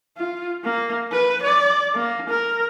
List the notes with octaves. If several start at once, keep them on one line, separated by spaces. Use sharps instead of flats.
F4
A#3
B4
D5
A#3
A#4